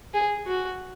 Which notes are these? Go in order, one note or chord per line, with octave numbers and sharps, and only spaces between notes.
G#4
F#4